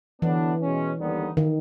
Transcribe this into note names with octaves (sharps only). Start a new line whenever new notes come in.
D3 E3 F#3 B3 D4
B2 G#3 C#4
D#2 D3 G3 B3 D#4
D#3